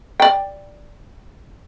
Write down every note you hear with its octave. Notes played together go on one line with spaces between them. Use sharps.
D5 G5